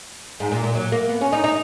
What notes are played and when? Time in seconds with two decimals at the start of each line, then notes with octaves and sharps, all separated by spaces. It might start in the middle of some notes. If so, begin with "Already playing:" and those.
0.40 G#2
0.52 A#2
0.64 A#2
0.75 F#3
0.92 A#3
1.09 B3
1.21 C#4
1.33 D#4
1.44 D#4